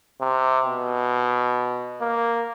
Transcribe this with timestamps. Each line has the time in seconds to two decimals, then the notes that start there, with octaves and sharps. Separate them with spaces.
0.21 C3
0.65 B2
2.01 A#3